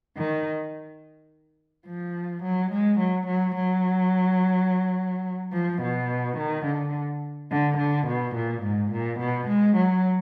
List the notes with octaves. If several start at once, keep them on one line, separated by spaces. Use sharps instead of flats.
D#3
F3
F#3
G#3
F#3
F#3
F#3
F3
B2
D#3
D3
D3
D3
B2
A#2
G#2
A#2
B2
G#3
F#3